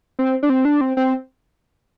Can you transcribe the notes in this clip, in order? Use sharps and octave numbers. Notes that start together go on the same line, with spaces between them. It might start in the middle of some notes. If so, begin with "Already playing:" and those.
C4
D4
C4
D4
C4
C4